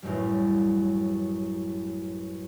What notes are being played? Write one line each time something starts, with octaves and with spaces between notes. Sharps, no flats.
A1 F#2 G3